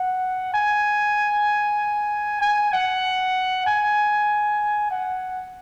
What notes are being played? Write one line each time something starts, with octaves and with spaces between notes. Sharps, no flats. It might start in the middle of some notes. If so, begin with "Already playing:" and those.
Already playing: F#5
G#5
G#5
F#5
G#5
F#5